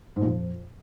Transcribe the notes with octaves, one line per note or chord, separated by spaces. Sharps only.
G#2
A#2
F2